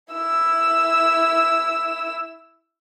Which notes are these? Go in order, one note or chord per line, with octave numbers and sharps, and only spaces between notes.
E4 E6